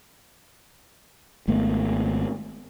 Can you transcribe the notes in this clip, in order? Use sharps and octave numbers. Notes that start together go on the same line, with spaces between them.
G#1 A3 B3